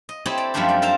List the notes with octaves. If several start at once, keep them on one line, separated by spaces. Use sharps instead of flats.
D#5
C4 E4 G4 A4 C#5 D#5
D5
F#2 F3 G3 A3 D4 C5
D5
A4 A#4 C5 F5 A5 A#5